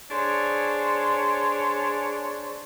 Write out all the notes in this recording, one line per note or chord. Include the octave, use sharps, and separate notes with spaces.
D4 G#4 C5 C#5